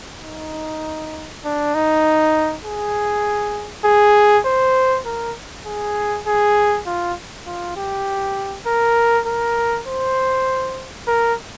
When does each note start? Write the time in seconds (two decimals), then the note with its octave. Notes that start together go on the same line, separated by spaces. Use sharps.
0.24 D#4
1.44 D4
1.75 D#4
2.65 G#4
3.85 G#4
4.45 C5
5.06 A#4
5.66 G#4
6.27 G#4
6.86 F4
7.47 F4
7.76 G4
8.67 A#4
9.26 A#4
9.87 C5
11.08 A#4